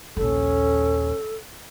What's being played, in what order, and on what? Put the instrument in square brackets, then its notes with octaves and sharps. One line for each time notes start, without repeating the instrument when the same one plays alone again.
[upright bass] A#1 D#2 [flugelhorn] C#4 [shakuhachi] A4